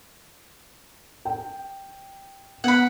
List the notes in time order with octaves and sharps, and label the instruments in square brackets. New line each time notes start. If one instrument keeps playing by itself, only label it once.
[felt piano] G5
[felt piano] B3 [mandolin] F#5 B5